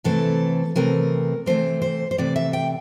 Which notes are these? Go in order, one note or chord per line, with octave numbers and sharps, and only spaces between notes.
C3 E3 A3 C4 A4
C3 E3 A3 C4 A#4
C3 E3 A3 C4 C5
C5
C5
C3 E3 A3 C4 D5
E5
G5